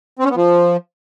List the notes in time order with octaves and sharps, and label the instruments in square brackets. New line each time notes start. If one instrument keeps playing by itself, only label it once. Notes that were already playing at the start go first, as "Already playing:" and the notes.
[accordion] C4
C#4
B3
F3